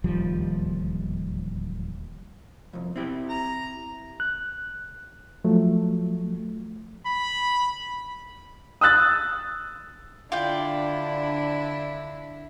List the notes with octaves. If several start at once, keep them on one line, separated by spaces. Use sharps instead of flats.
D1 D#2 F3 G3
C2 F2
C4 E4 G4
A#5
F#6
F3 F#3 A3
B5
D#6 E6 F#6 A6
D3 D4 E4 F4 D5 G5